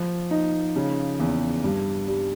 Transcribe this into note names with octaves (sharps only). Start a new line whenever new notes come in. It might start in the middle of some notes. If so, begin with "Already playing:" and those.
Already playing: F3
D#4
C#3
E2
G2
G3